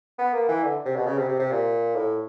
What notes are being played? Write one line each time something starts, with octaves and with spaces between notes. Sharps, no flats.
B3
A#3
E3
D3
C3
B2
C#3
C3
C3
C3
A#2
A2